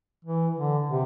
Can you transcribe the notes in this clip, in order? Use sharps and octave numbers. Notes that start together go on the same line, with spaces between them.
E3
D3
C3